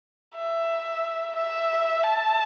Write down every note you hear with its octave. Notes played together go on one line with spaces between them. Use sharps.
E5
E5
A5